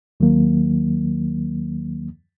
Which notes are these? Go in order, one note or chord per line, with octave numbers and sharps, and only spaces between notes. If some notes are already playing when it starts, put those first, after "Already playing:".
D#2 D#3 F#3 A#3